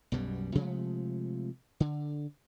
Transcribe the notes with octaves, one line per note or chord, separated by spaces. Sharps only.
B1 F#2 B2 G3
C3 F3 G#3 A3
D3